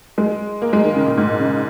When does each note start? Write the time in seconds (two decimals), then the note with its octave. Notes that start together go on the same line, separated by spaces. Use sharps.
0.18 G#3
0.62 A#3
0.73 G#3
0.84 D#3
0.95 C#3
1.06 A#2
1.17 G#2
1.28 A#2
1.39 C#3